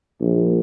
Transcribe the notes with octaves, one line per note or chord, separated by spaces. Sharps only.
A#1